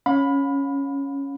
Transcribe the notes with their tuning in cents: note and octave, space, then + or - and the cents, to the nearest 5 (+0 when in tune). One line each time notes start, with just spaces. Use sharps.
C#4 +0 F5 +40 B5 +0